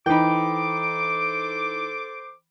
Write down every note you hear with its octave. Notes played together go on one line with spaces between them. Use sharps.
E3 D#4 A4 C5 G5 B5 D6